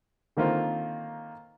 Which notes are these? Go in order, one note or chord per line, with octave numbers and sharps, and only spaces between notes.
D3 D#3 A#3 C4 F4